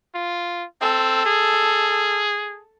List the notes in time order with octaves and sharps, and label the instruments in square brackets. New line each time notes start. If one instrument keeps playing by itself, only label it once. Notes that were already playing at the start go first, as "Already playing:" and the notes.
[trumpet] F4
[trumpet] C4 [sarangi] A4
[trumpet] G#4